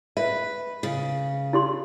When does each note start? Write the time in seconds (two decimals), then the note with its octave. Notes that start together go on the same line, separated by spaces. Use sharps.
0.17 B4 E5
0.83 C#3
1.53 E4 G4 C6